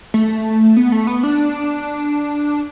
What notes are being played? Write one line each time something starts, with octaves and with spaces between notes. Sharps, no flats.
A3
B3
A3
B3
D4